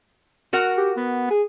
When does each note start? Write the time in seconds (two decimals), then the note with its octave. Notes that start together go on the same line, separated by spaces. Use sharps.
0.53 F#4 A#4 F#5
0.77 G4
0.97 B3
1.31 G#4